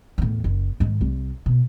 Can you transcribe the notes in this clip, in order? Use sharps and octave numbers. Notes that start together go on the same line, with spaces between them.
E2 A2
F#1
G#2 D#3
C2
B2